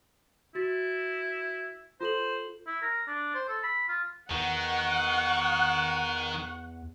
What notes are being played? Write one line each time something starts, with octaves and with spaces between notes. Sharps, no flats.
E4 F#4 A6
F4 A4 C5 F#7
E4
A#4
D4
C5
A4
B5
F4
E2 D#3 F#5 C#6